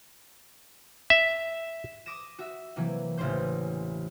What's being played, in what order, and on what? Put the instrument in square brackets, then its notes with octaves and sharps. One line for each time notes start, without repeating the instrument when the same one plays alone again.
[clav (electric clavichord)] E5
[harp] D6 D#6 A#6 E7
F#4 E5
C3 E3 F#3 A#3
E1 A1 C#3 C#4 C5 G6